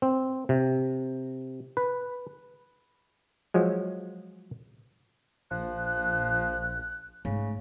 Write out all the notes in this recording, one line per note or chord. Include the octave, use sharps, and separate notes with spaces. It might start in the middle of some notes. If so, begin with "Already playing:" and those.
C4
C3
B4
F3 F#3 G#3
A#1 F3 F#6
G#2 C#3 A3